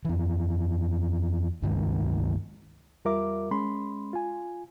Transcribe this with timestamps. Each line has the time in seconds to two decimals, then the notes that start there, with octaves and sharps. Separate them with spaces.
0.05 F2 E3
1.62 C#2 G2 D#3 G#3
3.05 E2 G3 F4 A#4 E5 D6
3.51 G#3 C#4 B5 C6
4.13 F4 G#5